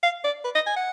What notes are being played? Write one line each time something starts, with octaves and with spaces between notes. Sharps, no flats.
F5
D5
B4
D#5
G#5
F#5